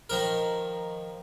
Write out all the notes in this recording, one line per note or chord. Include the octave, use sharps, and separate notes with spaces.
D#3 F3 A#4